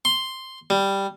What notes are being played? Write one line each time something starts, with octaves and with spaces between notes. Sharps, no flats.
C6
G3